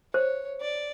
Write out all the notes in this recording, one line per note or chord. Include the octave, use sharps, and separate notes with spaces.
C5 C#5
D5